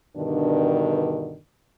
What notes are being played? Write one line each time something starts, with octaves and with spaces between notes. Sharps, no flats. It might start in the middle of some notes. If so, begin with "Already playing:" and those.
G2 B2 D3 D#3 D4